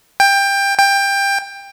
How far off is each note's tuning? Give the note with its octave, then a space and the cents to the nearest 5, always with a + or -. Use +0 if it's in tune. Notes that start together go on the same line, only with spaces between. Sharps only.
G5 +20
G5 +20